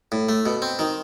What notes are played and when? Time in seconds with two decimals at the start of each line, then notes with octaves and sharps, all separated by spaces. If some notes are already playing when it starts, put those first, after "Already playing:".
0.12 A2
0.29 A3
0.46 B2
0.62 C4
0.79 D#3